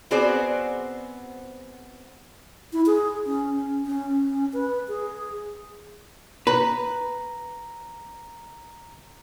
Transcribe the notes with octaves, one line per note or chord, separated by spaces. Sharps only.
B3 C4 F#4 G#4 C5 D5
E4
G#4
C#4
C#4
B4
G#4
B4 A#5